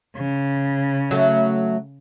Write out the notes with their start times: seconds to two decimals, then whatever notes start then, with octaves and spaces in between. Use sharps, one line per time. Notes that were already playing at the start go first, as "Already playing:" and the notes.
0.16 C#3
1.11 F#3 A3